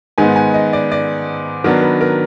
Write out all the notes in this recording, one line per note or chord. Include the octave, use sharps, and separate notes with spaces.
G#2 D#3 G#3 B3 D#4 G#5
G#5
D#5
D5
D5
D#3 F#3 B3 D4 A#4
B4
A#4